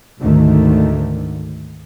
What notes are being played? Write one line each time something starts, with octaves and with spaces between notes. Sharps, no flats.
D2 G#2 D3 D#3 A3